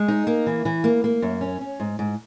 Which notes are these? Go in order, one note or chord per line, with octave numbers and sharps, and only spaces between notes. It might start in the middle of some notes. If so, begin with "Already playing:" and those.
Already playing: G#3
D#4
A#3
E3
E3
A#3
A#3
F#2
C#4
C#4
G#2
G#2